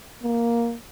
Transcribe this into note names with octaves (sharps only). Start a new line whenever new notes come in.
A#3